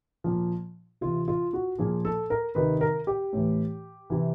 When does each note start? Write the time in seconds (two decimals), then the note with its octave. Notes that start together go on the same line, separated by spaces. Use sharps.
0.24 A#2 F3
1.01 C3 E3 F4
1.28 F4
1.53 F#4
1.79 A#2 F3 G#4
2.05 A4
2.30 A#4
2.55 C3 D#3 B4
2.81 A#4
3.07 G4
3.33 A2 E3
4.10 C3 E3